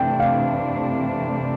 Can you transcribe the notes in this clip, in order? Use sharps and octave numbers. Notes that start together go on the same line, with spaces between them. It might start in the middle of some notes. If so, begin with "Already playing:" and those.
Already playing: C3 E3 A3 D4 G5
F5